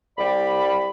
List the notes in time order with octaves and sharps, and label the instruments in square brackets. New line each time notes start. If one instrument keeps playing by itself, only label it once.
[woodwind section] C2 G3 D5 B5